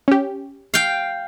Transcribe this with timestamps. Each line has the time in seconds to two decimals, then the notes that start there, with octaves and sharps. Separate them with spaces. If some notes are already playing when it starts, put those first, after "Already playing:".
0.08 C#4 G4
0.74 F5 G5